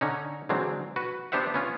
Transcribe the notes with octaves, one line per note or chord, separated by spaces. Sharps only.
D3 C#4 D#4
D3 E3 F#3 G#3 C4
F#4 B4
B3 D4 G4 C5 E5 F#5
B3 C#4 F4